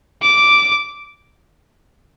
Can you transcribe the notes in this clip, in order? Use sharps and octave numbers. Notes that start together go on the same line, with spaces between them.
D6